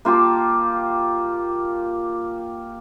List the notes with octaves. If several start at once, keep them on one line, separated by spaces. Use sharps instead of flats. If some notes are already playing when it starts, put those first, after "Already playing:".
A#3 F4 G4 A5